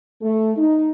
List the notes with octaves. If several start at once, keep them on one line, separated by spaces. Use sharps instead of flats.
A3
D#4